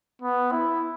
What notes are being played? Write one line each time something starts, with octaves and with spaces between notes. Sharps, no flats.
B3
E4